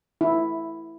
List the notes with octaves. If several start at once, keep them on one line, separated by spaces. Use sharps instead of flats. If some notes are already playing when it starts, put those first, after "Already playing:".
E4